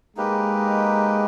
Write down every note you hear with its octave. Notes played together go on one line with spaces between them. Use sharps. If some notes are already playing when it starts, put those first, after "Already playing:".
G#3 A#3 D#4 G4 B4